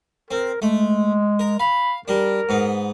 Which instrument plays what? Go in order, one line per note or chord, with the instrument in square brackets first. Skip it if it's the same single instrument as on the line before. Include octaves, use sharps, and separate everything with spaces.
[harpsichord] C4 [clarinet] A#4
[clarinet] G#3 [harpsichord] A3
[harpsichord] A#4
[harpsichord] F5 [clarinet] B5
[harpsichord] G3 D4 [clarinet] A#4
[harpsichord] G#2 B3